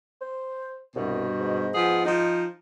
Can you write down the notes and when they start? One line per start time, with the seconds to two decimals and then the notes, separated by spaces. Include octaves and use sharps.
0.21 C5
0.96 C2 G2 B2
1.40 G#2
1.74 F3 B3 G#4
2.05 F3 D#4